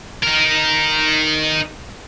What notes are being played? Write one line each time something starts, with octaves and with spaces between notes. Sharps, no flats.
D#4 A#4